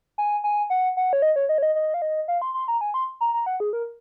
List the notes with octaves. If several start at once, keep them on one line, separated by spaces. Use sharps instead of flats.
G#5
G#5
F#5
F#5
C#5
D#5
C#5
D#5
C#5
D#5
D#5
F5
D#5
F5
C6
C6
A#5
G#5
C6
A#5
A#5
F#5
G#4
A#4